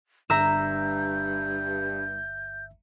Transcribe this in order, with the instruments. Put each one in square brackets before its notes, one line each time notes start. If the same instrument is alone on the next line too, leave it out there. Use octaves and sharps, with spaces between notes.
[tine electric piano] G1 E5 [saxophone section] G2 [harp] A#5 E6 [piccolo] G6